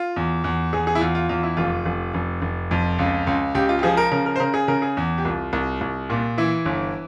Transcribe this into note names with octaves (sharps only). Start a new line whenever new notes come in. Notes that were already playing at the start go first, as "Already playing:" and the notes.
Already playing: F4
E2
E2
E2 G#4
G#4
E4
E2 F4
F4
E2 F4
E4
F1 F4
F1
F1
F1
F2
C#2
C#2
C#2 G4
F4
G4
F3 G#4
A#4
C#3 A#4
A#4
C5
C#3 A#4
G#4
C#3 A#4
G#4
E2
G4
C2 F4
C2
C2
A#2
E3 E4
G1